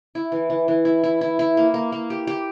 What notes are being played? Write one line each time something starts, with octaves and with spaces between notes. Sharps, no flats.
E4
E3
E3
E3
E4
E4
E4
E4
A#3
A#3
A#3
G4
G4